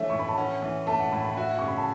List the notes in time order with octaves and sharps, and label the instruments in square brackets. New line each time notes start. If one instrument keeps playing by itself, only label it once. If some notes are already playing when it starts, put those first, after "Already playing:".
Already playing: [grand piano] E3 A3 C#4 [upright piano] C#5 E5
[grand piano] A2 [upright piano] C#6
[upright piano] B5
A5
[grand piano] C#4 [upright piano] F#5
[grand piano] E3
[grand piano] A3 [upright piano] A5
[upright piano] F#5
[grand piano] A2 [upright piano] B5
[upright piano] B5
[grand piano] F#4 [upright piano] E5
[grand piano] C#3 [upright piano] C#6
[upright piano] B5
A5